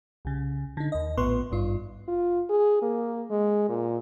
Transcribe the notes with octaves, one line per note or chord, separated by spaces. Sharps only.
C2 C#3
D3 D#4
D#2 D#5
A#1 A2 B3 B4 C6 C#6
G#1 G2 F4
F4
G#4
A#3
G#3
A#2